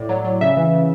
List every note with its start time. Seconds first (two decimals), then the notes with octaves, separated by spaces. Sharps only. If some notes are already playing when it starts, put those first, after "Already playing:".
Already playing: A2 D5
0.09 F#3
0.25 F#3
0.41 C#3 E5
0.57 E3
0.73 C#3